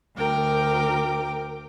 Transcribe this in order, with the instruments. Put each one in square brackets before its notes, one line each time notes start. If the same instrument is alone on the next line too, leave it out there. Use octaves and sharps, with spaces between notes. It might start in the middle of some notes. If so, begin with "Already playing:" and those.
[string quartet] D2 A#4 G5 D6